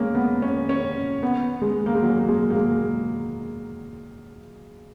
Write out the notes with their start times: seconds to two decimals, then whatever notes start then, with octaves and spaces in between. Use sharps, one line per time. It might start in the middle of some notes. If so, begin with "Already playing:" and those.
Already playing: G#3 A#3 C#4
0.15 B3
0.42 C#4
0.69 C#4
1.23 B3
1.62 G#3
1.86 A#3
1.95 G#3
2.02 F#3
2.19 A#3
2.29 G#3
2.50 A#3
2.56 G#3